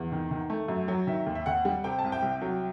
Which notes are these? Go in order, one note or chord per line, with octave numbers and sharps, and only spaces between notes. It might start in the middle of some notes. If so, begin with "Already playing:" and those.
Already playing: E2
D#3
D#3
A3
F#2
F#3
D#3 E5
D#2
E5
D#2 F#5
G3
C3 G5
A5
C2
G5
C2
F#3